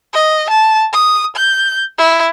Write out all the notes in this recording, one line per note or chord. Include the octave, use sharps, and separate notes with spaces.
D#5
A5
D#6
G6
E4